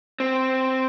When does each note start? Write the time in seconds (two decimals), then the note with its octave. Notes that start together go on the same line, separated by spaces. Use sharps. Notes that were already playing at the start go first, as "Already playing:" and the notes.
0.20 C4